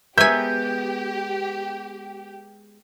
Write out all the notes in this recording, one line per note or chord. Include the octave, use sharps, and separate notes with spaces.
G#3 B3 G4 A#4 E5 G#5 G6